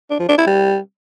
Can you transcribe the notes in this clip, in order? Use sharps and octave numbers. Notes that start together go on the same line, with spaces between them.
D4
F3
D4
E4
G3